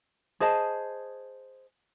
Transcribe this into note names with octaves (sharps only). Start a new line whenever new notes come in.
G#4 C5 D#5 A5